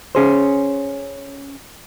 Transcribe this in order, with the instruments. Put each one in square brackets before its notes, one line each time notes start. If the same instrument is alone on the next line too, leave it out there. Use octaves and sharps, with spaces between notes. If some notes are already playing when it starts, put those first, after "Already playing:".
[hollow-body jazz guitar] C#4 G#4 C5